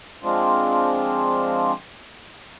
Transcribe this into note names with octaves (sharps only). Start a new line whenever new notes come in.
F3 G#3 C4 D4 F4